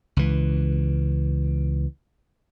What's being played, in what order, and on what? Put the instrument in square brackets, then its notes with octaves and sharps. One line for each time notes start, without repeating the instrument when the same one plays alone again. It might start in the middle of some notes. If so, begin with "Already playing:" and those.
[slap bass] C#2 E3